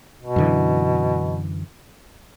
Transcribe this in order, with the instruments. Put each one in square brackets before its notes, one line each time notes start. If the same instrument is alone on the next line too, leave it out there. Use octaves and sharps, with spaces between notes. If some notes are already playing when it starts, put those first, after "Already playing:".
[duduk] B2
[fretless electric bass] F#2 D3 E3